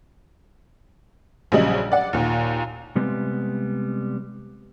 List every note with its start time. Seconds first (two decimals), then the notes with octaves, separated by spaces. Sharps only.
1.52 A#1 C#3 F#3 G3 D#5 F#7
1.92 D5 F#5
2.13 D#2 A#2
2.96 C3 G3 G#3 B3 C4